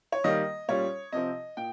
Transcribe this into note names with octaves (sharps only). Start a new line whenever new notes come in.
C#5
D#3 G3 A#3 D#5
A#2 G3 C#4 F4 C#5
C3 F3 C4 D#5
A#2 G5